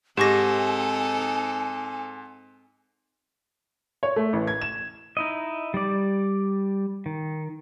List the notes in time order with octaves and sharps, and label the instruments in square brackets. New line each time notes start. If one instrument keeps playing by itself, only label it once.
[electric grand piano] G#2 [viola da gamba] C4 D#4 A4 [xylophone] G4 C#6 A#6 [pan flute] G#5
[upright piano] C#5
A3
A1
G#6
E7
[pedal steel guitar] D#4 E4 D#5
G3 D5
D#3